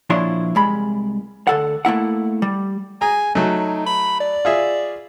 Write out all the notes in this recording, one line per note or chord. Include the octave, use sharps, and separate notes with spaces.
A#2 F3 D4 E4 C#5 C6
C2 G#3 B5
D2 A4 F#5
A3 A#3 E4 F#5
G3
G#4 G#5 A#5
F#3 A3 D#4
B5
D5
F4 G#4 E5